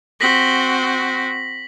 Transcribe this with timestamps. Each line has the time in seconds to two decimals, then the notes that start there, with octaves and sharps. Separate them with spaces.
0.21 C4 F#4 A#6 B6 F#7